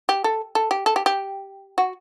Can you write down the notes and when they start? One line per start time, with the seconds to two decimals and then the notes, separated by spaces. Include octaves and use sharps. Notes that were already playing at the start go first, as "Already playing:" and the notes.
0.09 G4
0.24 A4
0.55 A4
0.71 G4
0.86 A4
0.96 G4
1.06 G4
1.78 F#4